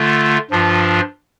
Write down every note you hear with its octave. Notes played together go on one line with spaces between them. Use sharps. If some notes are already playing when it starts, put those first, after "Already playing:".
Already playing: D3 A3 F4
G2 F3 D4 F4